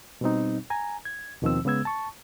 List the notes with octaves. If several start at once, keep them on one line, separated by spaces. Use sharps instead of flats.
B2 G3 C4 D#4
G#5 A#5
G#6
D#2 B2 D#3 F3 C4 E6
C#3 G#3 B3 E6 G#6
A5 C#6